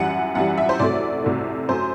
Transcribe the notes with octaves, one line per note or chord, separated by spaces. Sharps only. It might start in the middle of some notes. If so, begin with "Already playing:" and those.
Already playing: F#2 E3 G3 F#5
F#2 E3 G3 F#5
E5
C5
C2 C3 F#3 A3 D5
C2 C3 F#3 A3
F#2 F#3 A3 C5